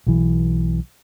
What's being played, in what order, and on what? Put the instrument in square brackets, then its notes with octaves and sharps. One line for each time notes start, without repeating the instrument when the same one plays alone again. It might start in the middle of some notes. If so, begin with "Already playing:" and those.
[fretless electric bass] B1 E3